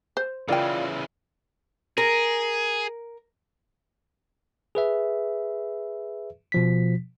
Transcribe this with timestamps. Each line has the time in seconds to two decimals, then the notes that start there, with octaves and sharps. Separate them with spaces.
0.17 C5
0.49 C#3 E3 F4 A#4 D5 F5 G5
1.98 G#4 A#4
4.75 G#4 B4 E5
6.52 B2 F3 B6